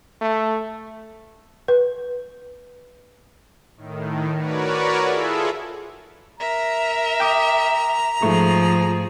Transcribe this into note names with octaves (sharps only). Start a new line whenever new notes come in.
A3
B4
A2 D#3
F#4 A#4 B4 C#5 D5
E4 F4 G#4 A4 E5
A#4 E5 A#5
G5 D6 D#6
G#2 F3 A3 G#4 C#6